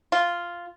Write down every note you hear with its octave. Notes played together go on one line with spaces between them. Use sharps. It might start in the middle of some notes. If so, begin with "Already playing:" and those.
F4